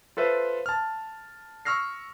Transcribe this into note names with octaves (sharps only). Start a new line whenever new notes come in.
F4 A4 B4 C5 E5
A5 F6
C#6 E6 F6 A#6 C7